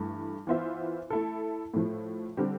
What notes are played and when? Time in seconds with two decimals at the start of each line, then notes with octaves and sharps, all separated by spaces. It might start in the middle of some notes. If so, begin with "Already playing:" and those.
Already playing: G2 E3 A3
0.47 E3 B3 F4 C5 E5
1.10 A3 E4 A4
1.74 A2 F3 A3
2.37 D3 G3 C4 G4